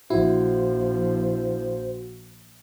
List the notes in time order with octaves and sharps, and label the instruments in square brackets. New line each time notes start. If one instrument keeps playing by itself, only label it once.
[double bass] A#1 F3 [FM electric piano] E4 [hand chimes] F#4 [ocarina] C5